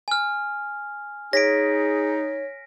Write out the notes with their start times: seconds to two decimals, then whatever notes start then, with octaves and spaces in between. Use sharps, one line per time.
0.08 G#5 F6
1.33 D#4 G#4 C#5 A#6 B6 D7